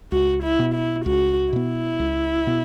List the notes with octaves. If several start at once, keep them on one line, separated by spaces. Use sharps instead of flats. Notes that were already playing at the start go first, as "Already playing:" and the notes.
C#2 F#4
E4
B2 B3
E4
C#2 F#4
B2 B3 E4
C#2
B2 B3